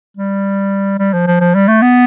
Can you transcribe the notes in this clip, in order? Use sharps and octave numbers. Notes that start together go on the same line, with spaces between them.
G3
G3
F3
F3
F3
G3
A3
B3